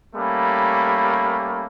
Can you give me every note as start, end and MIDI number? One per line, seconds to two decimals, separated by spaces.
0.16 1.65 55
0.16 1.65 57
0.16 1.65 58
0.16 1.65 61
0.16 1.65 83